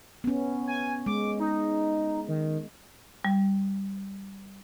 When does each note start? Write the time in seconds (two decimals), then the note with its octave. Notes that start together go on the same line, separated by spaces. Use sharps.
0.24 B3 C#4
0.67 G#5
1.06 G#3 D6
1.40 D#4
2.28 D#3
3.25 G3